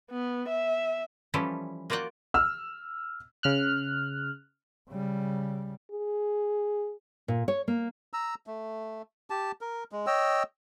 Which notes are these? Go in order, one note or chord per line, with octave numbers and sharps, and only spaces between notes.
B3
E5
E3 F3 G3 C#4 E4 A4
A#3 F4 F#4 D5 F#5 G5
E6 F6
C#3 F6 F#6
C#3 G3
G#4
A#2
C#5
A#3
A#5 E6
A3
G4 A5
A#4
G#3
C#5 D#5 G5 E6